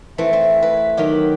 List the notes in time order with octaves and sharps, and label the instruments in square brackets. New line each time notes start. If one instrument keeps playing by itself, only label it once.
[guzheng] E3 A3 C4 [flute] E5
[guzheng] C4
B4
D#3 F#3 G4